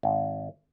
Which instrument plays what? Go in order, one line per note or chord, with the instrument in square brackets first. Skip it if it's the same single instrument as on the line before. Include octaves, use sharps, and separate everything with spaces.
[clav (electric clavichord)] G#1